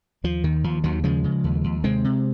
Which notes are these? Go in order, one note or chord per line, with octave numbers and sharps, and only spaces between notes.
D#2 F3
D#2 D#3
D#2 F3
D#2 D#3 F#3
C#3 F3 G#3
C#3
D#2
D#2
C3 G#3 C4
C3